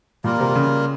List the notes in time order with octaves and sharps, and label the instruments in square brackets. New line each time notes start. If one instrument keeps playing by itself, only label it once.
[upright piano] A#2 [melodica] G3 A#3 F4 A#4
[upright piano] C3
C#3